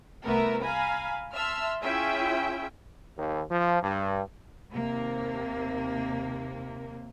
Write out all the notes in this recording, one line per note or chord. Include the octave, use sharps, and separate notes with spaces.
C2 A3 B3 A#4 E5
F5 G#5 A#5 B5
E5 A5 C6 E6 F6
C#4 E4 F4 G#4 E5 G5
D#2
F3
G2
D#2 C3 A#3